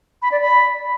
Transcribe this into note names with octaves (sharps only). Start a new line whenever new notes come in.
B5
D5
B5